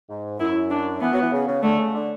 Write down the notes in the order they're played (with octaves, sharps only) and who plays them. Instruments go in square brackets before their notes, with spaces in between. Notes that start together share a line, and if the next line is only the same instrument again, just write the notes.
[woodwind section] G#2
[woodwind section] F#2 [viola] E4
[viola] D4
[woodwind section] E3 [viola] B3
[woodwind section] F#3
E3
C#3
C#3
[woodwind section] D3 [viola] A3
[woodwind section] C#3
D3